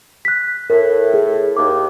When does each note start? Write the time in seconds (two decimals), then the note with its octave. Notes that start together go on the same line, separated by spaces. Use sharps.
0.25 F#6 B6
0.70 A2 A#4
1.14 G#4
1.57 D#2 D6